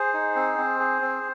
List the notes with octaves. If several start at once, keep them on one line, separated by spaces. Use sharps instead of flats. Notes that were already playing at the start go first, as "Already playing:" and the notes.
Already playing: G#4 C5
D#4
C4
C4
G#4
C4